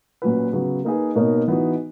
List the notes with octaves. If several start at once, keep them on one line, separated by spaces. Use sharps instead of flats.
A#2 F#3 C#4 F#4 B4
C#3 F#3 B3 F#4
A#3 D#4 G#4 B4
B2 A#3 D#4 A#4 C#5
E3 B3 D#4 F#4